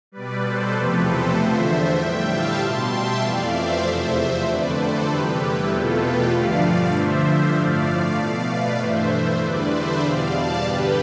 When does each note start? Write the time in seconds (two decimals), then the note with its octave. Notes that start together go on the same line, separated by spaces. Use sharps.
0.12 B2 G3 B4 D5
0.43 A4 C5
0.74 E2 C3 F3 A3 G4 B4
1.04 A4 C5
1.35 E2 D3 F3 A3 C5 E5
1.97 A2 G3 E5 G5
2.28 F5 A5
2.60 B2 G3 A5 C6
2.91 E5 G5
3.21 F2 E3 A3 D5 F5
3.52 C5 E5
3.83 E2 C3 F3 A3
4.45 F2 D3 A3 B4 D5
4.76 A4 C5
5.07 E2 C3 G3 G4 B4
5.38 E4 G4
5.69 E2 B2 A3 F4 A4
5.99 G4 B4
6.30 G2 D3 F3 A3 D5 F5
6.62 D5 F5
6.93 G2 D3 F3 C5 E5
7.54 A2 F3 A3 D5 F5
8.16 B2 A3 D5 F5
8.47 B4 D5
8.78 G2 E3 A3 C5 E5
9.40 E2 D3 G3 B4 D5
9.71 C5 E5
10.02 E2 B2 G3 D5 F5
10.33 F5 A5
10.64 G2 D3 G3 G4 B4